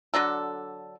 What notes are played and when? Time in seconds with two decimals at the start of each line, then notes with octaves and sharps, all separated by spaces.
0.14 D3 F#3 D4 A4